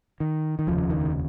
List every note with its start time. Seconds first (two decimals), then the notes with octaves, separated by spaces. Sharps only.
0.20 D#3
0.59 D#3
0.67 F1 D#2 C#3 F3
0.91 D#3